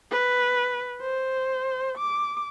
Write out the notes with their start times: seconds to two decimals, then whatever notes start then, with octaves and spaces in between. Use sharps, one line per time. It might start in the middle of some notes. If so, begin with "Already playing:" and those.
0.11 B4
1.01 C5
1.98 D6